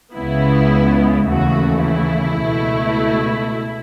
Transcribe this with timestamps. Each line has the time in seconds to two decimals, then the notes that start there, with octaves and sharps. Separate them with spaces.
0.14 C#2 C#3 G#3 B3 E4
1.28 D#2 C#3 E3 A3 F#4
1.85 E4
2.43 C#2 B2 A3